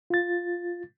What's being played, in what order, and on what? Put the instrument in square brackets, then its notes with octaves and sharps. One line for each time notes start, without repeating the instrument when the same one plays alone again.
[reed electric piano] F4 A6